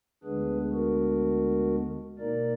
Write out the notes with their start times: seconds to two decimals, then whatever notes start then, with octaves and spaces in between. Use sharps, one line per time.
0.24 D2 D3 G#3 B3 D4 G#4 B4
0.72 F#4 A#4
2.19 B2 A#3 D#4 A#4 D5